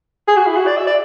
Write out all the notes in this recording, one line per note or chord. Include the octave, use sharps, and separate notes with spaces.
G#4
F#4
E4
F#4
D5
E5
D5